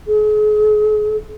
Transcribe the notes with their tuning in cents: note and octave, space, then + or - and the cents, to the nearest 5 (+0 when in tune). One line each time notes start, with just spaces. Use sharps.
G#4 +40